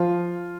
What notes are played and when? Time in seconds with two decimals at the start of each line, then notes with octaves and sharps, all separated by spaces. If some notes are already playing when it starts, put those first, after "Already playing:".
Already playing: F3 F4